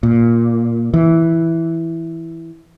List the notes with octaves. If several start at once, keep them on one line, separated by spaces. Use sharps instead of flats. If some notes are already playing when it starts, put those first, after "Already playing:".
A#2
E3